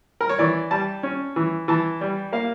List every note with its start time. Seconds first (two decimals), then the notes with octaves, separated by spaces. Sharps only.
0.21 A#4
0.29 C#5
0.38 E3 D5
0.71 G3 A5
1.03 C#4
1.36 E3
1.68 E3 A5
2.01 G3
2.33 A#3 F5